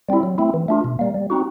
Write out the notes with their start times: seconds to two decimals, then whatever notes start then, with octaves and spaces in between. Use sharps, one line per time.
0.09 G3 C4 E4
0.23 F#3
0.38 A3 C4 E4
0.54 E3
0.68 A3 D4 F4
0.84 B2
0.99 G3 A#3
1.14 G3
1.30 C4 D#4 F#4